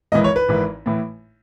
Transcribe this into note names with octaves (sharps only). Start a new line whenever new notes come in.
G#1 G#2 E3 D#5
C#5
B4
G#1 G#2 E3
A2 E3